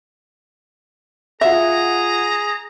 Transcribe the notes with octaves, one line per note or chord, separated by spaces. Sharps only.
F4 G#4 E5 F#5 A#5 A#6